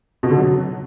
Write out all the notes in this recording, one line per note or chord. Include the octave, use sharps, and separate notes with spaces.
B2
D3
F#3